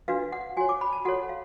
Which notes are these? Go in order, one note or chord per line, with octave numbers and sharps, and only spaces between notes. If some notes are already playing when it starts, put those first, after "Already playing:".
D4 F#4 B4 F5
F#5
F#4 C#5 G#5
D6
B5
A5
F#4 A4 C#5 F#5
F5